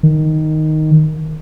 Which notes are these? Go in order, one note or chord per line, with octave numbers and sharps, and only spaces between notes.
D#3